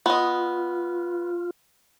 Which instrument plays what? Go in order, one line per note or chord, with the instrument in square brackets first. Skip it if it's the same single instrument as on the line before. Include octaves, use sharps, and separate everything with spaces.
[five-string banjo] B3 D#5 [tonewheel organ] F4